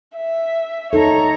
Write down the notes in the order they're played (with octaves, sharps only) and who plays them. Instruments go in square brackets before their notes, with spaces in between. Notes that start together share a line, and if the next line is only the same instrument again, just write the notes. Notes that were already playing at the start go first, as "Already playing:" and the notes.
[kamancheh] E5
[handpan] D#4 A4 [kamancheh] C#5 A#5